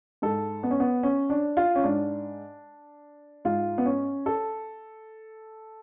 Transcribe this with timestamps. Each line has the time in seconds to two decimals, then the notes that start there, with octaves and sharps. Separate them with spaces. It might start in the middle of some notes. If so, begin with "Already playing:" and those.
0.22 G#2 A4
0.63 B3
0.71 C#4
0.80 B3
1.03 C#4
1.30 D4
1.57 F4
1.75 C#4
1.83 G#2 D4
3.45 G#2 F4
3.78 B3
3.86 C#4
4.26 A4